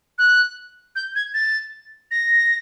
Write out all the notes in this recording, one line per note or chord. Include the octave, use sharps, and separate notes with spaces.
F#6
G6
G#6
A6
A#6